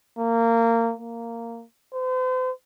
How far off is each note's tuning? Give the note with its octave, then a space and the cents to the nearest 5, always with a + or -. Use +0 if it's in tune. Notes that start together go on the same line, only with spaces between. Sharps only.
A#3 -20
A#3 -10
C5 -40